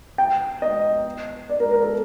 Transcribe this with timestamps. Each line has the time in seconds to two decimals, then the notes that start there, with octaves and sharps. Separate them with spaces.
0.18 G5
0.62 D#5
1.50 D5
1.60 A#4
1.71 A#4
1.82 A4